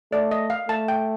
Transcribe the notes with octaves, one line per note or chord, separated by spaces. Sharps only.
A3 D5
D#5
F5
A3 A5
G5